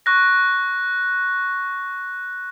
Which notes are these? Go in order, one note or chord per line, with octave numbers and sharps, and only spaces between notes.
C#6 F#6 A#6